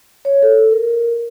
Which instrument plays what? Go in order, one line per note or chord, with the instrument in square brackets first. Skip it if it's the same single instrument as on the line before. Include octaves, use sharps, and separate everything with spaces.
[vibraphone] C#5
A4
A#4